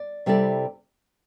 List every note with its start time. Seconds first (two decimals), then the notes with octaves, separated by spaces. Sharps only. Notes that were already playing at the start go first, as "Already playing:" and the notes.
Already playing: D5
0.26 C3 G3 E4 A4 D5